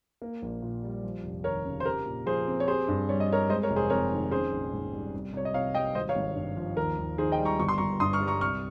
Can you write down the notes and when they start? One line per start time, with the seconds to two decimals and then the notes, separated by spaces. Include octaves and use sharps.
0.22 A#3
0.42 A#1
0.62 A#2
0.83 G3
1.04 F3
1.24 F1
1.44 D#2 A#4 C#5
1.65 C#3
1.80 C5
1.85 G4 A#4
2.06 A#2
2.26 F3 G#4 C5
2.48 C4
2.60 C#5
2.67 G4 G#4 C5
2.88 G2
3.09 G3 C#5
3.20 D#5
3.29 C4 A#4 C#5
3.49 G#3 C5 D#5
3.63 A#4 C#5
3.70 F1
3.76 G#4 C5
3.90 F2 A#4 C#5
4.11 D#3
4.31 C#4 G#4 C5
4.51 A#1
4.72 G#2
4.93 G3
5.14 C2
5.33 C2 C#5
5.45 D#5
5.54 C3 C#5 F5
5.74 G3 D#5 G5
5.95 G#1 C5 D#5
6.09 C#5 F5
6.16 G#1
6.36 G2
6.57 F3
6.77 D#2 A#4
6.98 D#2
7.18 D#3 G#4 C5
7.32 D#5 G5
7.38 G3
7.45 A#5 C#6
7.60 G1 C#6
7.69 C6
7.78 G1 A#5 C#6
8.00 G2 C6 D#6
8.13 C#6 F6
8.21 G3
8.27 A#5 C#6
8.41 C2 C#6 F6